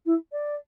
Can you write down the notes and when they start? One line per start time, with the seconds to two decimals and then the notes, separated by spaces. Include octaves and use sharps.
0.05 E4
0.32 D5